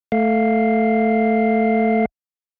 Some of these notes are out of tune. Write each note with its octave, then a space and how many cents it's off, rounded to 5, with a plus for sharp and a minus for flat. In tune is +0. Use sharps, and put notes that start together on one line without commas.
A3 +0 F5 +0